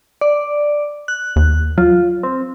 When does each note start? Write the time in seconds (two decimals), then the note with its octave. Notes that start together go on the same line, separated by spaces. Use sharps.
0.21 D5
1.08 F#6
1.36 D#2
1.78 F#3 F4
2.23 C4